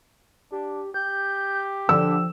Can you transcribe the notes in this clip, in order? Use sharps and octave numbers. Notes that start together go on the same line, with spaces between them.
D4 G4
G4 G6
D3 F3 E6